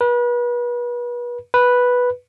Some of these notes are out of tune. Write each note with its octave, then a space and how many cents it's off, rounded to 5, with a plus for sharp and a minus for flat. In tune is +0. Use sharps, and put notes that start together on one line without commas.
B4 -35
B4 -5